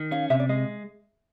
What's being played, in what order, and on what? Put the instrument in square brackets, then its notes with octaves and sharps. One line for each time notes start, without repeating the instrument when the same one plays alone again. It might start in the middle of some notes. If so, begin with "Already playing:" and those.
Already playing: [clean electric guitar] D#3
[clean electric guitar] C#4 [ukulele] F5
[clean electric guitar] C3 [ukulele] E5
[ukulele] D5
[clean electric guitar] G#3 [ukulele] D#5